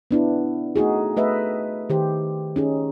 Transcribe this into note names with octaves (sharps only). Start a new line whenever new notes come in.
B3 D4 E4
A3 D#4 F#4 G#4
A3 B4 D#5 E5
D#3 G4 C5
C#4 D#4 G#4